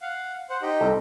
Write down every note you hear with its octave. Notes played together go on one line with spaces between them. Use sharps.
F5 F#5
C5 F#5
D#4 G4 D#5
C2 A4